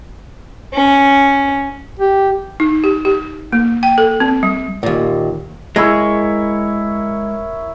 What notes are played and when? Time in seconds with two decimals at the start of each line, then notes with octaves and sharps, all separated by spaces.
0.74 C#4
1.99 G4
2.60 D#4
2.84 G4
3.05 G4
3.52 A#3
3.83 G5
3.98 A4
4.20 C4
4.43 G3
4.83 D#2 A#2
5.76 G#3 E4 A#4 C#5